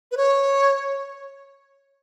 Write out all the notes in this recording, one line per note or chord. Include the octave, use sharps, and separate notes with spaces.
B4
C#5